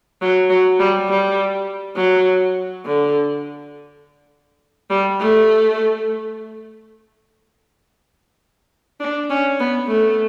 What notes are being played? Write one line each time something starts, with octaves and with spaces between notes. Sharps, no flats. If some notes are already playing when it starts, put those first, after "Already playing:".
F#3
F#3
G3
G3
F#3
D3
G3
A3
D4
C#4
B3
A3